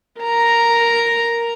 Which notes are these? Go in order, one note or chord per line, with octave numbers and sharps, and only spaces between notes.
A#4 A#5